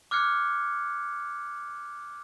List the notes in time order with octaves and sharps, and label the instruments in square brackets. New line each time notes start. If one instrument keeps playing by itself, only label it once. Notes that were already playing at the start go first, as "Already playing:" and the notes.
[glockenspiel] D6 F6 F#6 G#6 C#7